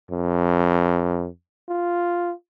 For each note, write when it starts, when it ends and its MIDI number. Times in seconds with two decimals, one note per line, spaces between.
0.11 1.27 41
1.69 2.32 65